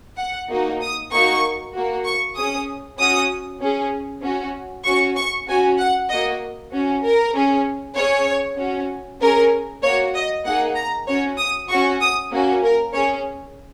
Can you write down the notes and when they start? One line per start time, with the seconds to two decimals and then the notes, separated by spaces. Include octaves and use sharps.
0.18 F#5
0.49 A#3 D#4 F#4
0.80 D#6
1.11 A#3 D#4 F#4 C#6
1.73 A#3 F#4
2.05 C#6
2.36 C#4 G#4 D#6
2.98 C#4 F#4 D#6
3.60 C#4 G#4
4.22 C#4 F#4
4.84 C#4 F#4 C#6
5.15 C#6
5.47 C#4 F#4 G#5
5.78 F#5
6.09 A#3 F#4 D#5
6.71 C#4 F#4
7.02 A#4
7.34 C#4 G#4
7.95 C#4 G#4 C#5
8.57 C#4 F#4
9.20 C#4 G#4 A#4
9.82 A#3 F#4 C#5
10.14 D#5
10.44 A#3 D#4 G#4 F#5
10.75 A#5
11.07 C#4 F#4 C#5
11.38 D#6
11.69 C#4 F#4 C#6
12.00 D#6
12.31 A#3 C#4 F#4
12.62 A#4
12.93 C#4 G#4 C#5